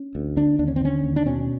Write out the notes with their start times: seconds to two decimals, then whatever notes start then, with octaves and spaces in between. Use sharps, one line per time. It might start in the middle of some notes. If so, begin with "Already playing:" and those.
Already playing: C#4
0.15 D2
0.37 D3 D4
0.59 D#2 D4
0.68 C#4
0.76 C4
0.81 D3 C#4
1.04 D#2
1.16 D4
1.26 B2 C#4